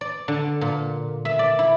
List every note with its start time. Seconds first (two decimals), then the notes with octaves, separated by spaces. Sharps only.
0.01 D5
0.28 D3
0.61 A#2
1.25 E5
1.39 D5
1.59 E4